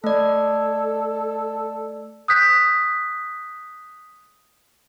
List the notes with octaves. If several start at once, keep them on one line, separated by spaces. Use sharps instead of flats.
A3 A4 D5
D#6 F#6 G6 B6